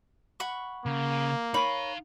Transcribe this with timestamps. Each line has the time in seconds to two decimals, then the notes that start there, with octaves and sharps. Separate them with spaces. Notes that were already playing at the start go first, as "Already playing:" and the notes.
0.40 F#5 B5 C#6
0.86 C#3 A#3
1.54 D#4 A#4 C#5 F5 B5